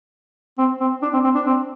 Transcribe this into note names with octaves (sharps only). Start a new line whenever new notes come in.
C4
C4
D4
C4
C4
D4
C4